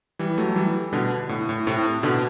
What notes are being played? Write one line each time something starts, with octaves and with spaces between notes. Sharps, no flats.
E3 G3
F#3 A3
E3 G3
B2 D3
A2
A2
A2 C3
B2 D3